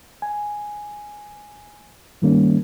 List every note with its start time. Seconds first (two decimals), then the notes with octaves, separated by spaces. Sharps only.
0.22 G#5
2.22 G2 D#3 G3 A#3 C#4